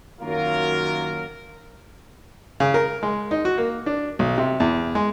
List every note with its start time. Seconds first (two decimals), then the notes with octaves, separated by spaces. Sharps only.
0.21 F#2 D#3 F#3 A#3 F4 A#4
2.60 C#3
2.74 A#4
3.03 G#3
3.31 D#4
3.45 F#4
3.58 A#3
3.86 D4
4.19 B1
4.38 C3
4.60 E2
4.95 G#3